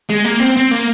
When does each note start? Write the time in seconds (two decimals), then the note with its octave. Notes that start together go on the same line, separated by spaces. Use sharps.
0.09 G#3
0.25 A#3
0.40 C4
0.56 C4
0.71 A#3